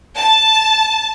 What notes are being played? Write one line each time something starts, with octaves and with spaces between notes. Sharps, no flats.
A5